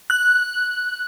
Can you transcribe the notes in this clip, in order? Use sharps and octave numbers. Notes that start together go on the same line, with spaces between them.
F#6